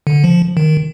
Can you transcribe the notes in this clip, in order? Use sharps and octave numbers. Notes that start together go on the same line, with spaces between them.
D3
F3
D#3